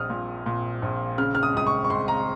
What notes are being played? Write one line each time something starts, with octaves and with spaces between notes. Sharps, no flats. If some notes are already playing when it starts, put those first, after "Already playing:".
Already playing: A#1 D#6 F6
A#2
A#2
A#1
C#3 F6
F6
D#6
C#2 D#6
C#6
C#6
C#2 C6
A#5